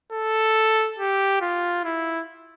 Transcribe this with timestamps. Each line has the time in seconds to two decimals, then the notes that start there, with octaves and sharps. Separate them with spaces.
0.13 A4
0.99 G4
1.41 F4
1.85 E4